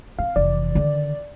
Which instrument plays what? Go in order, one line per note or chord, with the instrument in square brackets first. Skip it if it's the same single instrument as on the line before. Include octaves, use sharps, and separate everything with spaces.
[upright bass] C4 [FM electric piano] F5
[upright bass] F1 E3 [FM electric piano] D5
[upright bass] D3 D#3